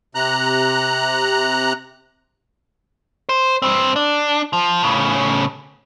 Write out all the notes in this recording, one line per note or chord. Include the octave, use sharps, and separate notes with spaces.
C3 A#5 F#6
C5
G2 C4
D4
F3
A2 C#3